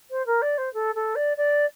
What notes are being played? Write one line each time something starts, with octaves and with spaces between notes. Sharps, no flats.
C5
A#4
D5
C5
A4
A4
D5
D5